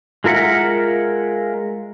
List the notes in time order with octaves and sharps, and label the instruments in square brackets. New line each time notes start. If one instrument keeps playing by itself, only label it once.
[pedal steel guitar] G#3 F4 A#4 E5 F#5